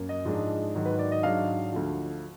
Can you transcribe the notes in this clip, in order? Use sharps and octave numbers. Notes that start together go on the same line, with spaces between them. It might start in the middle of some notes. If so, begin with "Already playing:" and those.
Already playing: F#2 A#3
D#5
G#2 F3 G#3 D4
G#2 D#3 F#3
B4
D5
D#5
G#2 F#3 D4 F5
D2 D3 F3